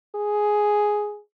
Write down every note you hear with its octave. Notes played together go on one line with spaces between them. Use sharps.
G#4